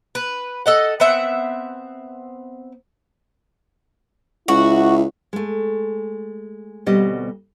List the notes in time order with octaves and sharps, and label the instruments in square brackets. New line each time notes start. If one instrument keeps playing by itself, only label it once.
[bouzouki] B4
A4 D#5 F#5
B3 C4 E5 F#5
[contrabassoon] C#2 [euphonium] E4 [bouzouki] F#4
[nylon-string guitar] G#3 A3
D2 B2 G3 C4 D#5